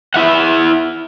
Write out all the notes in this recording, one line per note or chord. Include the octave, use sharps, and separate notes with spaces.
E4 E5 F#5